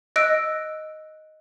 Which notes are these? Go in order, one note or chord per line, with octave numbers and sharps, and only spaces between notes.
D#5 E6 F#6 D7